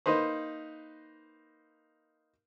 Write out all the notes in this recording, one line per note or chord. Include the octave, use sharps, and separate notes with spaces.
A#3 D#4 B4 C5